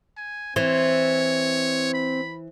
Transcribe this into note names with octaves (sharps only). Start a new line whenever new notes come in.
G#5
E3 C4 C5 C#5
B5